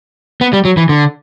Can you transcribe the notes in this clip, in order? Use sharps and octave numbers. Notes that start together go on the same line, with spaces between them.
B3
G3
F#3
E3
D3